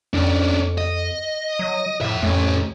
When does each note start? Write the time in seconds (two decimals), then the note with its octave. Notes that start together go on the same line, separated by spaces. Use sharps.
0.14 F2 C#4 D4
0.78 D#5
1.59 F#3
2.01 F2 A2 E5
2.22 F2 A2 C#4